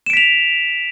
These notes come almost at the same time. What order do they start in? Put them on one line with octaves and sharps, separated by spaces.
E7 D7 B6 F7